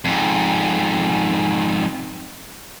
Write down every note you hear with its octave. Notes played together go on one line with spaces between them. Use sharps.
F2 G#2